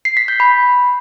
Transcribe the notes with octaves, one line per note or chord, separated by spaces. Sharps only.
C7
B6
G6
B5